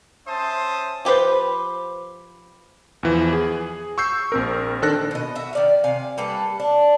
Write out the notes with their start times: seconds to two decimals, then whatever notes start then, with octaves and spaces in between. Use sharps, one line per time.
0.27 C#4 C5 E5 A5 C6 D#6
1.05 F3 G4 B4 C5
3.03 E2 E3 F3
3.33 G#4
3.98 C#6 E6 G6 C7
4.32 A#1 C4 A#4
4.82 D#3 D4 A4 C5 F#6 A#6
5.11 B2 D#5
5.35 F#4 E5
5.53 D#3 D5 F5
5.84 C3 F5 G#5
6.18 G3 A#3 A4 B4
6.60 D4